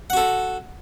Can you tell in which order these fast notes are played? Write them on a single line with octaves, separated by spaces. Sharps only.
F#5 F#4 A4